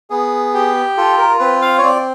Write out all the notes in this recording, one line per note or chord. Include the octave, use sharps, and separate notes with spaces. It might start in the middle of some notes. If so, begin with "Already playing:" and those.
B3 G#4
G4
F4 A4
A#4
C4 B4
F5
C#5
C4 D5